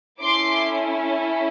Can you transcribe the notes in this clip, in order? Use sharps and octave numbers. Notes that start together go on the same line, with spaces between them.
C#4 E4 A4 C6 D6